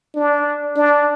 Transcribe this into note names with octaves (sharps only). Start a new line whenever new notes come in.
D4
D4